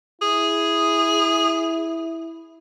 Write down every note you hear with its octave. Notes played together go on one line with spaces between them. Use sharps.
E4 G#4